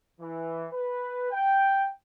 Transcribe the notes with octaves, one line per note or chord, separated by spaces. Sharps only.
E3
B4
G5